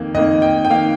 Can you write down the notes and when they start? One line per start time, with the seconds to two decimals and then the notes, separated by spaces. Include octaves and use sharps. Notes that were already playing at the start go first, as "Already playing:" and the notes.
Already playing: F2 D#3 A#3
0.14 F2 D#3 A#3 D#5
0.42 G5
0.65 G5
0.70 D#3 A#3 F5